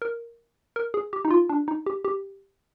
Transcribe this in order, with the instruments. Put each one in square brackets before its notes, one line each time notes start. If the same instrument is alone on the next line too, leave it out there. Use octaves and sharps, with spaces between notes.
[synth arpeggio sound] A#4
A#4
G#4
G4
D#4
F4
D4
D#4
G4
G4